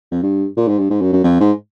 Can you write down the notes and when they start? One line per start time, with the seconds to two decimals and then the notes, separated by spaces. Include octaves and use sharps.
0.11 F2
0.23 G2
0.57 A#2
0.67 G#2
0.78 G2
0.90 G#2
1.01 F#2
1.12 F#2
1.24 F2
1.40 G#2